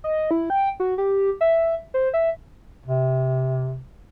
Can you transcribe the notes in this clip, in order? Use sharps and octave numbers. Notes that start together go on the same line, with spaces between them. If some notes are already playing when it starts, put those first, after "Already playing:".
D#5
E4
G5
F#4
G4
E5
C5
E5
C3